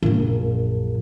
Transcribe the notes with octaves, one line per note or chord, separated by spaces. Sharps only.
A#1 F#2